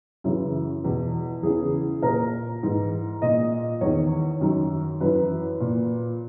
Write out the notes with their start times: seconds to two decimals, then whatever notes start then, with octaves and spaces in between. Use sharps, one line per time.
0.24 F#2 C#3 E3 E4
0.83 E2 B2
1.43 E2 C#3 E3 G#4
2.03 A#2 A#4
2.63 G#2 E3
3.22 A#2 D#5
3.81 E2 D#3 C#5
4.41 F#2 D#3
5.01 F#2 E3 B4
5.60 A#2